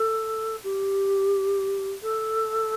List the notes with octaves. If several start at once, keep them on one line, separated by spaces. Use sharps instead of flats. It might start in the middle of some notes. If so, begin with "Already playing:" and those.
Already playing: A4
G4
A4